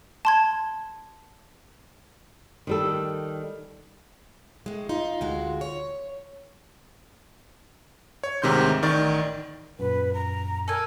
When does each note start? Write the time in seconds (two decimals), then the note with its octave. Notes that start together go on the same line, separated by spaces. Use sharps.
0.25 A5 C6 G#6
2.67 D#3 G3 A4
4.66 A2 G#3
4.89 D#4 F4
5.21 D2 G#3 F#4
5.61 C#5
8.23 C#5
8.42 D2 G#2 C3 D#3 C6 G6
8.82 A1 D#3 D5 C#6 A6
9.79 F#2 A#2 B4
10.14 A#5
10.68 A4 A#4 G#5